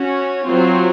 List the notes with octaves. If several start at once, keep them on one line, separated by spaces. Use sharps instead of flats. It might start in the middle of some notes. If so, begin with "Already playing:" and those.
Already playing: C#4 F#4 C#5
F#3 C4 F4 C5